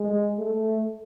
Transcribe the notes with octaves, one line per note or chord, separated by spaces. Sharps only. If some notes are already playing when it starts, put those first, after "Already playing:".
Already playing: G#3
A3